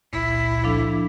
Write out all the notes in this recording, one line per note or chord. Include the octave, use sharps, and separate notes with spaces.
G#1 C#2 A#2 E4
F3 D4 A4